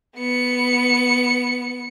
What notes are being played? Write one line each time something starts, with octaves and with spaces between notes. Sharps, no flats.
B3 C#7